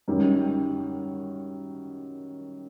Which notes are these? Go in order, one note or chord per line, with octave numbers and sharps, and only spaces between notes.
F#2 D#3 G3